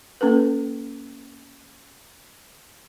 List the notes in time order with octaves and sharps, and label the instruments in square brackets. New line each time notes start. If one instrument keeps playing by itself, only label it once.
[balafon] A#3 C#4 A4 B4